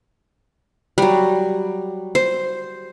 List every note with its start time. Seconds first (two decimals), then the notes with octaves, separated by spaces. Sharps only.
0.98 F#3 G3
2.15 C5